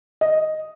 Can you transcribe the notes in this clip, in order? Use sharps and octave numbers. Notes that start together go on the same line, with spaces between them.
D#5